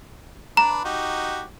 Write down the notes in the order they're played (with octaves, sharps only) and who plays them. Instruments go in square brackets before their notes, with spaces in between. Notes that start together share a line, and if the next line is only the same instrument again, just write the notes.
[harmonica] D4 B4 [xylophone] A#5
[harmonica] D#4 F#4 G4